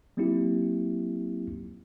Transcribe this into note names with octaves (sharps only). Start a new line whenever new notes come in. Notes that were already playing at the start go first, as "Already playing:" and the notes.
F#3 A#3 C4 D#4 E4 G4